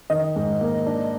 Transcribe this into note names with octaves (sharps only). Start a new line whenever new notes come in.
D#3 D#5
G#2
A#3
D4